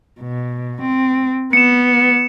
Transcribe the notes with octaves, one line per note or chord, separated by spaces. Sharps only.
B2
C4
B3 C#7 E7